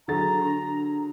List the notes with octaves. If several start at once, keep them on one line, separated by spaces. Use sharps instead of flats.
D3 F#3 G#4 A#5 A6
D4